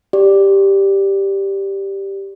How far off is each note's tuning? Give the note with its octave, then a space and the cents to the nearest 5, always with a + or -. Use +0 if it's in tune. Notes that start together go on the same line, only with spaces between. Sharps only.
G4 +0 D5 +0